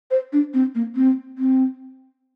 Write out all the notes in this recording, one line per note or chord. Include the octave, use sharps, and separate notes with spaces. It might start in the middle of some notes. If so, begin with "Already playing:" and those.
C5
D4
C4
A#3
C4
C4